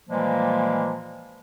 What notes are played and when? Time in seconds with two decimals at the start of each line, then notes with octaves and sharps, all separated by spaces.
0.09 A#2 E3 F3 G3 G#3 A#3